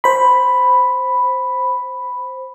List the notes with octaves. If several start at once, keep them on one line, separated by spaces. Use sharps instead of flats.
C5 B5